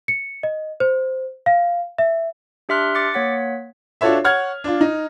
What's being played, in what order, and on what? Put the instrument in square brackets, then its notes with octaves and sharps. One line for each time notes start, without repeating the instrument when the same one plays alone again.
[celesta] C#7
D#5
C5
F5
E5
[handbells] D4 G4 E5 C6 F6 F#6
D6 A6 C#7
A#3 C#5 F#5 B6
[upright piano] D4 F4 F#4 A4 C#5 E5
C#5 F#5 F6 G#6
D4 F4
D#4